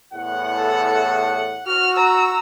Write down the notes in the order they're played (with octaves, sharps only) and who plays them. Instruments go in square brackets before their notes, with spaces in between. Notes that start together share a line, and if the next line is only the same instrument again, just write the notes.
[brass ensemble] E2 A2 F#5
[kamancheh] A4
[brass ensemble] F#4 [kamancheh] F6
[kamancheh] A#5 E6